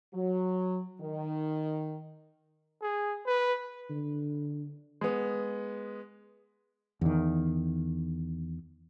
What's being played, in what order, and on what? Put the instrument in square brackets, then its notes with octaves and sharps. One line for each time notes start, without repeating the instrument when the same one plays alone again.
[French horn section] F#3
D#3
[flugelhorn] G#4
B4
[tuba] D3
[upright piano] G#3 B3
[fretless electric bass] E2 D#3